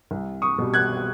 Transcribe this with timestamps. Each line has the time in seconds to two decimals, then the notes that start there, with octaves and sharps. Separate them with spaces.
0.11 C2
0.42 C#6 D#6
0.58 B2 G3
0.74 F#6 G#6